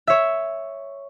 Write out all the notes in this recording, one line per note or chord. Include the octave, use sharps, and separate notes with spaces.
C#5 E5